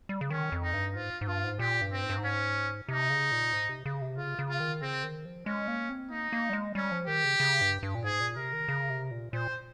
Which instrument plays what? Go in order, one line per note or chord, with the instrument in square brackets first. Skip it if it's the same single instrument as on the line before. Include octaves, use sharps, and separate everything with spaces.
[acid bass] G3
C#3
[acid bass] D#3 [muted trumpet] C#4
[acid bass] F2
[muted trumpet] D#4
[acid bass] G2
[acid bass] G#2 [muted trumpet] F4
[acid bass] G#2
[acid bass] G2 [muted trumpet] F4
[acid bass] G#2
[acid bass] A#2 [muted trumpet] G4
[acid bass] G2
[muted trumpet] C4
[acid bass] G#2
G2
G#2
[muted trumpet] C#4
[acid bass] C3 [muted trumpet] D#4
[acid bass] C#3
A#2
G#2
C3
C#3
C3
[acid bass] C#3 [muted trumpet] F4
[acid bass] C#3
[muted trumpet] F4
[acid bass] D#3
[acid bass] C#3 [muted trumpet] C4
[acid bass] D#3
F3
[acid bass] G#3 [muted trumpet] C#4
[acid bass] A#3
C4
[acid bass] A#3 [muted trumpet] D#4
[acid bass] A#3
G3
G#3
[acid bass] G3 [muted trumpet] C#4
[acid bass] F3
[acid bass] D#3 [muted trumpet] G4
[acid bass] C#3
C#3
G2
G2
A#2
[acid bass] G#2 [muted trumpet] G#4
[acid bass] A#2
[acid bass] C3 [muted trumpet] A#4
[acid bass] D#3
C#3
C3
A#2
[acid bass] A#2 [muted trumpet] C5